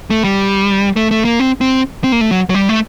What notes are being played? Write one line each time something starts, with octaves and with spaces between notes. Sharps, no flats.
A3
G3
A3
A3
A#3
C4
C4
C4
A#3
A3
F#3
F#3
G3
A3